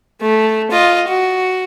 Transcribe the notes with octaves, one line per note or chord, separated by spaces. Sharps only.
A3
F4 D#5
F#4